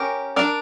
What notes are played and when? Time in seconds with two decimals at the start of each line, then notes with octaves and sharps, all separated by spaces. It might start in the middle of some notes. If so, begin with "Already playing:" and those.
Already playing: C#4 G4 A#4
0.36 D4 A#4 D5